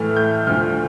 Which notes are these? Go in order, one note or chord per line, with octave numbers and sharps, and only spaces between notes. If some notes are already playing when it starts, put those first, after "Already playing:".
Already playing: A2 E3 A3 F6
G6
D2 D3 F3 F6